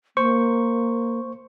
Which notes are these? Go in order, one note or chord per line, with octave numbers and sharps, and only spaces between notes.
A#3 C5 C#6